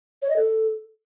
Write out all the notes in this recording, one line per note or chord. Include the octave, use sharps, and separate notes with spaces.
C#5
D#5
A4